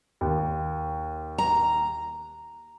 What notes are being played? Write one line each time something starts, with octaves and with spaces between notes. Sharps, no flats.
D#2
A#5